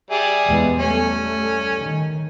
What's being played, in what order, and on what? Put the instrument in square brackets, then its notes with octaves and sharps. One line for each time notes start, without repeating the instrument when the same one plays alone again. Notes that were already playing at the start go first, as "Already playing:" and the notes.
[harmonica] G3 G#4 E5
[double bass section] E2 G#3 B3
[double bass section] G3 A3 [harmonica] C#4
[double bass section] D#3